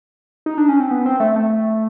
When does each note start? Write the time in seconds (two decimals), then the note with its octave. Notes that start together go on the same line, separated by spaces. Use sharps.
0.46 D#4
0.58 D4
0.69 C#4
0.80 C4
0.91 B3
1.06 C4
1.20 A3
1.36 A3